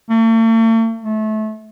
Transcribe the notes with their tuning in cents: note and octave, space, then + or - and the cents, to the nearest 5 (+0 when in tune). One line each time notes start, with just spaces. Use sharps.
A3 +45
A3 -25